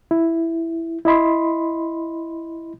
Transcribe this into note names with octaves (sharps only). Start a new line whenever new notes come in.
E4
E4 D#5 B5 C6